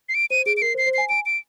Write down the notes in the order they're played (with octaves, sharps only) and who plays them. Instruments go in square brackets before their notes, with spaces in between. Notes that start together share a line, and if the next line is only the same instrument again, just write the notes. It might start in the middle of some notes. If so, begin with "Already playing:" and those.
[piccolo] C7
D7
[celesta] C5 [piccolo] D#7
[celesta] G#4 [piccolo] D7
[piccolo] D7
[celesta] A#4 [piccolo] C7
[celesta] C5
[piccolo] C7
[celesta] C5
[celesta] G#5 [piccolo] C7
[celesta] G#5 [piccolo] D7
[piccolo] D7